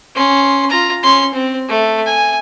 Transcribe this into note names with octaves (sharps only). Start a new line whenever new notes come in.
C#4 C6
F4 A#5
C#4 C6
C4
A3
G#5